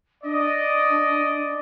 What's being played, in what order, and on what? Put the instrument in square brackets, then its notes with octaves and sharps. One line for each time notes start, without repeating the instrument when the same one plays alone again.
[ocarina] D4 [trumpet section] D5 D#5